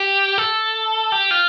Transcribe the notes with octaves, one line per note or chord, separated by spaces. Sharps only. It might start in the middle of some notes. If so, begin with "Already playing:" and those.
Already playing: G4
A4
G4
F4